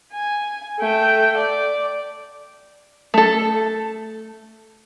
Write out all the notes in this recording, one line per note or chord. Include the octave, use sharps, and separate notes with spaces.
G#5
A3 G5
D5
A3 A4